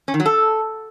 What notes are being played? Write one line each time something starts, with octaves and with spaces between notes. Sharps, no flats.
C#4
D#3
F#3
A4